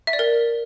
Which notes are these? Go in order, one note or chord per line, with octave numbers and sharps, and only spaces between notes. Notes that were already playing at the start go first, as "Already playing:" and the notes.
E5
D5
A#4